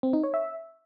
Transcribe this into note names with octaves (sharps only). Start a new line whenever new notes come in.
C4
D#4
C#5
E5